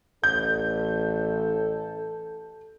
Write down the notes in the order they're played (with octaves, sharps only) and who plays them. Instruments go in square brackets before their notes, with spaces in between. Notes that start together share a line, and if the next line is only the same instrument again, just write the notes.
[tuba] A1 [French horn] A4 [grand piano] G6